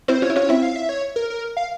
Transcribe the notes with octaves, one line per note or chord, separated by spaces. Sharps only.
C4 E4 C5
C#4 F4 C#5
E4
C#4 F4 C#5
C4 E4 E5
F5
E5
C#5
A#4
A#4
F5